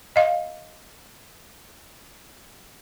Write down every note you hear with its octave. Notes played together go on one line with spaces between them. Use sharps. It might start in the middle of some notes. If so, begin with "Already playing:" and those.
D#5 F5